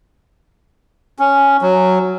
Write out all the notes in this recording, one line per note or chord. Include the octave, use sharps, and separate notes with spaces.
C#4
F#3